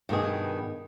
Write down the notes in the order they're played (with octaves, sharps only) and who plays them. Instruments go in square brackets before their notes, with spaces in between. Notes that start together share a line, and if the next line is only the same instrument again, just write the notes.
[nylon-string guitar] G2 B2 D#3 G#4